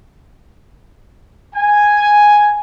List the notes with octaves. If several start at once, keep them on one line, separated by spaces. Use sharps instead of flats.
G#5